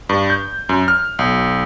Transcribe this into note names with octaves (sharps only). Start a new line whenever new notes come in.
G2
G6
F#2
F6
B1